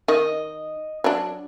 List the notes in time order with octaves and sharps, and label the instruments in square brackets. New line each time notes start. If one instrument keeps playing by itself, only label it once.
[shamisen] D#3 [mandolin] D#5
[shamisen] F#3 D4